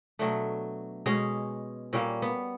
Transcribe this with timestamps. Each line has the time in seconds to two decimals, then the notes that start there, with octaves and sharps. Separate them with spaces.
0.19 B2 F#3 A3 D4
1.06 B2 G#3 C#4
1.93 A#2 G3 A#3 C#4
2.22 B3